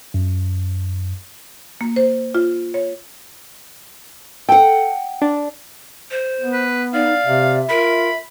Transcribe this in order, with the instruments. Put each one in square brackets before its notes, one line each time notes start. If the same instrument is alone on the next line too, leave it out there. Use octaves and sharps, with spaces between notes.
[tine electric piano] F#2
[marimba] A#3
C5
F4
C#5
[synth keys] A4 [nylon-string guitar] F#5 G5
[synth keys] D4
[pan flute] C5
[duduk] B3
[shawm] B4
[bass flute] D#4 [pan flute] D5 [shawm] F5
[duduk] C3 [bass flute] E5
[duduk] F4 [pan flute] A#4 [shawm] B5